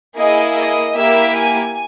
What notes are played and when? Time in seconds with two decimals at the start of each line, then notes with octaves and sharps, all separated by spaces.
0.17 A#3 E4 G#4 D#5
0.57 D#5
0.96 A#3 E4 G4 E5
1.36 G#5